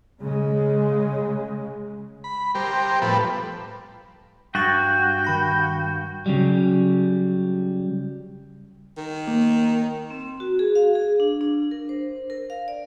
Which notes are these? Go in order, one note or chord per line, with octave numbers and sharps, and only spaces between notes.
C#3 G#3
B5
G3 G4 A#4 C5
A2 F3 G3 B3 A4 B4
G2 F#4 G5 C#6 A6 A#6
D#3 B5 A#6
C#3 F#3 G3
D#3
A#3
C4
F#4
G#4
F5
G#4
D4
D4
A#4
C5
A#4
F5
D5